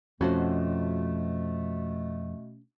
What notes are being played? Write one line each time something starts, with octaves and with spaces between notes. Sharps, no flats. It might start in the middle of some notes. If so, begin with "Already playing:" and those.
F2 B2 A3 C#4 F#4 C5